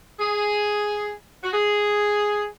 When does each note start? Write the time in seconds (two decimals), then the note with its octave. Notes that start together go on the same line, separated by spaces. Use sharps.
0.20 G#4
1.44 F#4
1.53 G#4